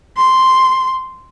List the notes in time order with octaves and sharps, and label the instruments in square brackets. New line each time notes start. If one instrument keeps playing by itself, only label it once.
[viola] C6